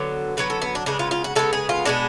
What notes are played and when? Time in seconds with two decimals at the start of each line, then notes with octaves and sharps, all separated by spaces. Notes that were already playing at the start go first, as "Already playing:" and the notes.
Already playing: D3 F#3 B3
0.37 D3 F#3 B3 B4
0.50 A4
0.62 B3
0.75 D4
0.86 C#3 G#3 B3 D4
0.99 F4
1.11 F4
1.24 F#4
1.35 C#3 G#3 B3 A4
1.53 G#4
1.69 F4
1.85 B2 G#3 B3 D4